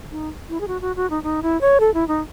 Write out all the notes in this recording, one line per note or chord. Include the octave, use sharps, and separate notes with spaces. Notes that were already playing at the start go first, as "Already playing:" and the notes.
D#4
E4
G#4
F#4
F#4
F#4
D#4
D#4
E4
C#5
A4
E4
D#4